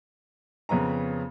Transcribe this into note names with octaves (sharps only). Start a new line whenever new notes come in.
F2 C#3 B3 A#5